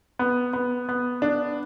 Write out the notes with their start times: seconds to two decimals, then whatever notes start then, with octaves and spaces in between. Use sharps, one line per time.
0.19 B3
0.53 B3
0.89 B3
1.22 D4